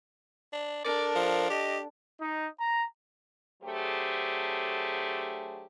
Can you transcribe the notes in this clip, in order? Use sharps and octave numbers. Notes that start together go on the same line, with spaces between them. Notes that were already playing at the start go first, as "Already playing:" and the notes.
D4
D4 A4 A#4 D5
F3
G4 D#5
D#4
A#5
D3 F#3 A3 G4 G#4 C5